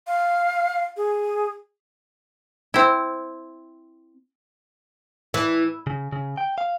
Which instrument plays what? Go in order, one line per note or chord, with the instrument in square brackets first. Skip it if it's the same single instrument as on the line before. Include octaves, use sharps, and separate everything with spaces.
[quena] F5
G#4
[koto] C4 E4
[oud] E3
[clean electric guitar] C#3
C#3
G5
F5